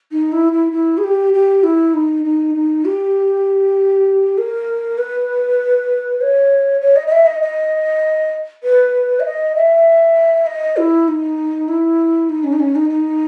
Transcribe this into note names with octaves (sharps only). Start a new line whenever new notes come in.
D#4
E4
E4
E4
G#4
G4
G4
E4
D#4
D#4
D#4
G4
A#4
B4
C#5
C#5
D#5
D#5
E5
D#5
D#5
B4
E5
D#5
E5
D#5
E4
D#4
E4
D#4
C#4
D#4
C#4
D#4
D#4